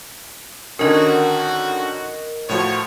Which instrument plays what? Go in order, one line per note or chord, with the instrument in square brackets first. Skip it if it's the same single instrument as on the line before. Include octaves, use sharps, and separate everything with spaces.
[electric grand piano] D3 D#3 C#4 [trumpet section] F#4 [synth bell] A#4 D#5
[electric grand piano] A2 F3 F#4 [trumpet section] C#5